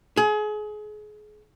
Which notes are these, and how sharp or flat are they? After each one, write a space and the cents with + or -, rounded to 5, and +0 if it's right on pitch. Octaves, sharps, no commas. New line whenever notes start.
G#4 +30